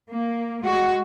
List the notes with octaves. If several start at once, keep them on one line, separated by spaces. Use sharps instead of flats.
A#3
G#3 F#4